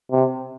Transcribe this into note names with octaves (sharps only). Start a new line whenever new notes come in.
C3